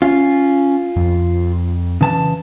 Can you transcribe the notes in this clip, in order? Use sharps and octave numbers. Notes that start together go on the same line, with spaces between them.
C#4 F4
F2
C#3 E3 A5